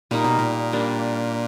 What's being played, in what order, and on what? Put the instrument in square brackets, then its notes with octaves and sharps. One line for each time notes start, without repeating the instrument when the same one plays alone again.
[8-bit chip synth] A#2 [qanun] G3 A#3 D#4
[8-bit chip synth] B2
A#2
[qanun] G3 A#3 D4